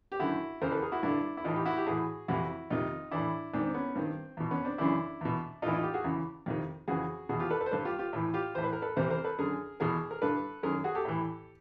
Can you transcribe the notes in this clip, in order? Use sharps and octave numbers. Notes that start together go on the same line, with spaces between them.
G4
F#2 D3 E4 F#4
E2 C#3 E3 A#4 C5
A4 B4
G#4 A#4
E4 F#4
G2 D3 D4 E4
E4
A2 E3 D#4 F4
G4
E4 F#4
G4
A2 E3 F#4 G#4
F2 C3 E3 E4 F#4
F2 C3 D#3 D#4 F4
A2 E3 D4 E4
G#2 D#3 C4 D4
C4
B3 C#4
G2 D#3 C4
E2 B2
B3 C#4
C4 D4
F#2 C#3 E3 D4 E4
E2 B2
A2 E3 D#4 E4 F4
D#4 F4
F4 G4
F#4 G#4
E2 C#3 E3
F2 C3 D#3
F2 C#3 E3 F#4 G#4
E2 B2 F#4 G#4
F4 G4
A4 B4
A4 B4
C5
G2 D3 A4 B4
F4 G4
F4 G4
A2 E3
F4 G4
A2 E3 C5
B4
A#4
A4 B4
E2 C3 E3 A#4 C5
A#4 C5
A4 B4
F#2 D3 G#4 A#4
E2 B2 G#4 A#4
A#4
G2 D3 A4 B4
F#2 D#3 G#4 A#4
F#4 G#4
G4 A4
A2 E3